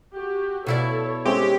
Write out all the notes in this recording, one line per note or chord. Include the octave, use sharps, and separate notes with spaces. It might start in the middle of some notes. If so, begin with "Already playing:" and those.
F#4 G4
B2 E4 A4 C#5 D5
G#3 C4 C#4 G4